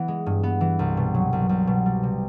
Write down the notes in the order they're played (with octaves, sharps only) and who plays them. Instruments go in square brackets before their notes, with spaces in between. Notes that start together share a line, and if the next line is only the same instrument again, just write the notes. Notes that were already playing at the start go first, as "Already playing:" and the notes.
Already playing: [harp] E3 B3
G#3
G2
B3
E3
C2
B2
F#3
C2
C2
B2
G3
C3